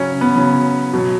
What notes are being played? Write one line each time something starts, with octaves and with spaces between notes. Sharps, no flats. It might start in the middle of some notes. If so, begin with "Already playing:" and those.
Already playing: C#3 F#3 C#4
B3
C#3 F#3
B2 F#3